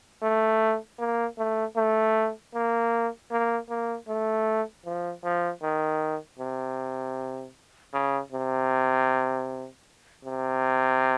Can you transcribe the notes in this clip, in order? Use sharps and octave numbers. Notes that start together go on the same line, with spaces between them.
A3
A#3
A3
A3
A#3
A#3
A#3
A3
F3
F3
D#3
C3
C#3
C3
C3